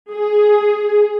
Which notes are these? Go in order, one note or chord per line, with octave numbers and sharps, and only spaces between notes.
G#4